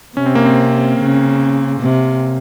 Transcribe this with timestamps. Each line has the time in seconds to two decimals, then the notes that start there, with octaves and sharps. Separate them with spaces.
0.17 C3 C#4
0.26 C4
0.35 A#3
0.45 C4
0.98 C#3
1.81 C3